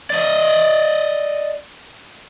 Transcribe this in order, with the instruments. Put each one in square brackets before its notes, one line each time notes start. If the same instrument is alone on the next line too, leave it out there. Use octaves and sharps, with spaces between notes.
[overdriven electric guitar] D5 D#5